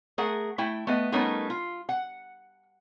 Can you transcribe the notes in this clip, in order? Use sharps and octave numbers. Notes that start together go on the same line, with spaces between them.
A3 G#4 A#4 F#5
A3 E4 G5
A3 B3 D#5
G3 A3 B3 C#4 D#4 A#4
F4
F#5